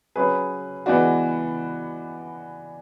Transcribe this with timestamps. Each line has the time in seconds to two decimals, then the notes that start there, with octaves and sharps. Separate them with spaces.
0.16 F#3 C#4 G#4 B4
0.86 E3 G#3 B3 D4 F#4